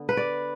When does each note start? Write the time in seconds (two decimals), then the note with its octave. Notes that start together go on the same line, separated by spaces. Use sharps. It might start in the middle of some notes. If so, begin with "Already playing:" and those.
Already playing: D3 B3
0.09 B4
0.17 D5